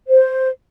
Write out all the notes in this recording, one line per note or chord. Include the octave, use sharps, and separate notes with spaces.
C5